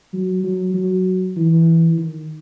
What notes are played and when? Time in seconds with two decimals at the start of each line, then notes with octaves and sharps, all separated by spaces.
0.13 F#3
0.43 F#3
0.74 F#3
1.36 E3
1.97 D#3